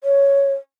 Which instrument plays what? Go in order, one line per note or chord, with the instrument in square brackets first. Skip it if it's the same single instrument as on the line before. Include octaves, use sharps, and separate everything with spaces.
[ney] C#5